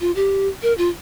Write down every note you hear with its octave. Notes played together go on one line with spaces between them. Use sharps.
F4
G4
A#4
F4